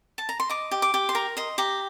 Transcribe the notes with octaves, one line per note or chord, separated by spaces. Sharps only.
A5
A#5
C6
D#5 D6
G4
D6
G4
C6
A#4 A#5
D#5 C6
G4 A#5